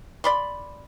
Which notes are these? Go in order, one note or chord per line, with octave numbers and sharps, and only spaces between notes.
D5 B5 C6